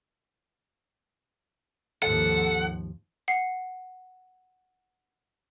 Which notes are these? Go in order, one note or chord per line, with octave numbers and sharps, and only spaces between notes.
G#1 D#2 F3 A4 F#5
F#5 C7